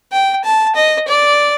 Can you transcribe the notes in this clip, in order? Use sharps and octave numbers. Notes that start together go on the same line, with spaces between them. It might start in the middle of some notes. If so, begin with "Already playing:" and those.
G5
A5
D#5
D5